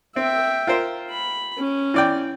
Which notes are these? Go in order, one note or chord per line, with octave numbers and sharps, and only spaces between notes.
C4 E5 G5
F4 A#4 C5
B5
C#4
E3 D5 G5